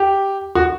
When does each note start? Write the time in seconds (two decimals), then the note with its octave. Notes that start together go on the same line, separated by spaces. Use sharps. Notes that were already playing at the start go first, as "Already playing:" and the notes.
Already playing: G4
0.55 F#4